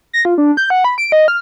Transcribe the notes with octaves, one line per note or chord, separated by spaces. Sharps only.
A#6
F4
D4
G6
F#5
B5
D7
D#5
F6